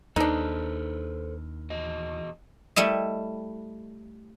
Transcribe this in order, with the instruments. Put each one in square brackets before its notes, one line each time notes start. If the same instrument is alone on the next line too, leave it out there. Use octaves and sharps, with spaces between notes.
[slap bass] D#2 [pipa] D4 D#4 [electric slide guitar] A4 B4 C5
[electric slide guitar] E2 F#4 D#5
[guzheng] G3 A3 E4 D#5